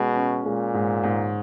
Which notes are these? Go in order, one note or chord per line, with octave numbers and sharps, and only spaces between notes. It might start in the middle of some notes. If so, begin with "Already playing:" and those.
Already playing: B2 G#3 C#4
C#4
A#2 G#3
G#2
G#2